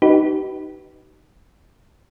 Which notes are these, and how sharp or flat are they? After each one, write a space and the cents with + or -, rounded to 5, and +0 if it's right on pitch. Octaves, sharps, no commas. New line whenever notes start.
D#4 +0 G4 -40 B4 +0